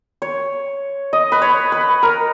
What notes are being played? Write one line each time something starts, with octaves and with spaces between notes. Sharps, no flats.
C#5
D#5
B4
C#5
B4
A#4